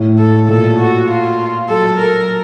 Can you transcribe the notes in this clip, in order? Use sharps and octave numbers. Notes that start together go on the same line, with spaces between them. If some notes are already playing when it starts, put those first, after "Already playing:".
Already playing: A2
A4
A#2 A4
F#4
F4
F#3 A4
A#4